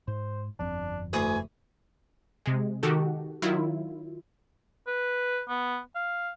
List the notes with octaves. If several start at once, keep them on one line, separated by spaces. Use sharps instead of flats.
G#2 C5
G1 F2 C4 D4
D2 E3 G#5 D#6
C3 G#3
D#3 F#4 G4 A4
D#3 F#3 E4 F4
B4
B3
F5